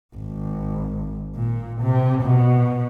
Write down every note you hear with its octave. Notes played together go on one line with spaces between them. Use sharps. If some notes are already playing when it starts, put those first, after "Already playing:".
G#1
A#2
C3
B2